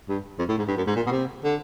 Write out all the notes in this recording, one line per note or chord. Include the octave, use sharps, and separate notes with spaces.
G2
F2
A2
G#2
G2
F#2
G#2
A#2
B2
C3
D3